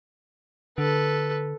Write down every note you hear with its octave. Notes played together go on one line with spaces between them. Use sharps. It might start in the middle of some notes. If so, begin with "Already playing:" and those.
D3 A4 B4